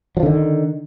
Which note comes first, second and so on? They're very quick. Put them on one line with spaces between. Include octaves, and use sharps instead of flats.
F#3 F3 D3 D#3